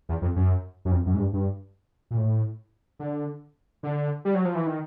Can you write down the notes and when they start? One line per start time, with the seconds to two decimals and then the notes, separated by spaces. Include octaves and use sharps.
0.09 E2
0.22 F2
0.36 F#2
0.85 F#2
0.92 F2
1.06 F#2
1.14 G#2
1.19 G2
1.33 G2
2.11 A#2
2.17 A2
2.99 D3
3.83 D3
4.25 G3
4.34 F#3
4.45 F3
4.55 E3
4.67 D#3